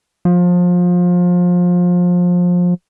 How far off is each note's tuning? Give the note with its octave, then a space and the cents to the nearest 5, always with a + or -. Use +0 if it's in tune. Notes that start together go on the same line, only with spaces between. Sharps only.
F3 +25